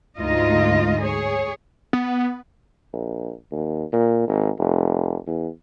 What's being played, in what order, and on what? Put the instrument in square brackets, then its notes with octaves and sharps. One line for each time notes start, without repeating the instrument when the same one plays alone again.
[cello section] D2 G#2 D#4 F4 D#5
G#4 C#5
[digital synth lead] B3
[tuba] A#1
D#2
A#2
G#1
F1
E2